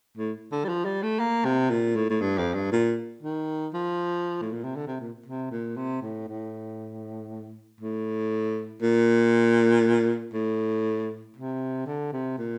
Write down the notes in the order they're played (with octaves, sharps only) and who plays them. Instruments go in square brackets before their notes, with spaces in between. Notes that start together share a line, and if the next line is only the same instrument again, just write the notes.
[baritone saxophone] A2
D3
G3
F3
G3
A3
A#3
C3
A#2
A2
A2
G2
F2
G2
A#2
D#3
F3
A2
A#2
C3
D3
C3
A#2
C3
A#2
C3
A2
A2
A2
A#2
A2
C3
D3
C3
A#2